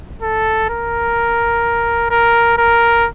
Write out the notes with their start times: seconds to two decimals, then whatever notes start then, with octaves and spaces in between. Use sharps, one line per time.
0.22 A4
0.70 A#4
2.11 A#4
2.58 A#4